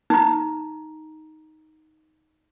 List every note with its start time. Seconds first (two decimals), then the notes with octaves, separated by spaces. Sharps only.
0.10 D#4 A#5